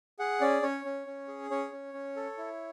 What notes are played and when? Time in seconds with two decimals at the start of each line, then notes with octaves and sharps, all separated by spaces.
0.19 G#4 F#5
0.41 C#4 D5
0.62 C#4 C#5
0.85 C#4
1.07 C#4
1.28 G#4
1.50 C#4 C#5
1.72 C#4
1.94 C#4
2.16 A4
2.38 E4